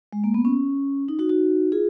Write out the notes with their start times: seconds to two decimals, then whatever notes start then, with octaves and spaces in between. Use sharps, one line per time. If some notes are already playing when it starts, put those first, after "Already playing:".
0.13 G#3
0.24 A#3
0.34 B3
0.45 C#4
1.08 D#4
1.19 D#4 F#4
1.29 D#4 F#4
1.72 F4 G#4